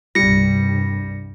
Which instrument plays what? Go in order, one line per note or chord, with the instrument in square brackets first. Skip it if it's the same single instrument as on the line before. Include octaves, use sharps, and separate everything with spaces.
[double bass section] C2 G2 [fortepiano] G3 [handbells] A#6 C#7